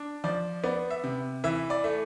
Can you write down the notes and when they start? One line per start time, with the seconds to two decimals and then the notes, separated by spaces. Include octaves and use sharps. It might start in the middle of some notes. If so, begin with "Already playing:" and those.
Already playing: D4
0.24 F3 D5
0.64 B3 D5
0.90 E5
1.04 C3
1.44 E3 E5
1.70 D5
1.84 A3